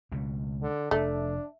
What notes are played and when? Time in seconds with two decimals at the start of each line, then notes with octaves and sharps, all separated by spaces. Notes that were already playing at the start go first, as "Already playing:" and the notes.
0.12 C#2 B2
0.62 D3
0.91 F1 A3 D4